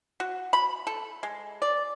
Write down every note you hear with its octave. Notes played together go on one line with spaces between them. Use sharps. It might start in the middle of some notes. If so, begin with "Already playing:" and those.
F#4
B5
A4
G#3
D5